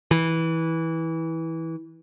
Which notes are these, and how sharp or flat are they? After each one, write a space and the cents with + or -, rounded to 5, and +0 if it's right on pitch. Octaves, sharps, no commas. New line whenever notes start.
E3 -15